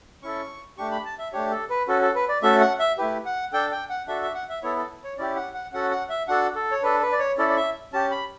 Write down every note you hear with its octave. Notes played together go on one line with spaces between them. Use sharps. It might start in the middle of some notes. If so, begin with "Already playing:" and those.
C#4 E4 A4 C#6
A3 D4 G4 C#6
B5
A5
E5
A3 D4 G4 C#5
A4
B4
C#4 F#4 A4
A4
B4
D5
A3 C#4 F#4 A4 E5
F#5
E5
A3 E4 G4 B4
F#5
D4 A4 G5
G5
F#5
D4 F#4 A4 E5
E5
F#5
E5
B3 E4 A4 C#5
A4
C#5
C#4 E4 G4 D5
F#5
F#5
C#4 F#4 A4 F#5
F#5
E5
D4 F#4 A4 F#5
A4
C#5
D4 A4 B4
B4
D5
C#5
C#4 E4 A4 D5
D5
E5
C#4 G4 A5
B5